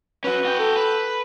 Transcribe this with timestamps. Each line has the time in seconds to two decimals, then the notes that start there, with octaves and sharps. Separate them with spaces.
0.24 C#4 F#4 B4
0.45 F#4 G5
0.59 A4
0.76 B4